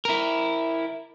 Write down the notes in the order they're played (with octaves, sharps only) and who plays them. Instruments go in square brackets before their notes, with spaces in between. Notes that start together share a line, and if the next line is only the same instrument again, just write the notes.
[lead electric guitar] E4 A#4